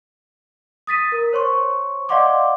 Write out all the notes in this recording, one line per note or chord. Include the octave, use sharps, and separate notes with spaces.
D#6 A6 B6 D#7
A#4
C5 C#5 C6 C#6
D5 D#5 F5 F#5 C6 D6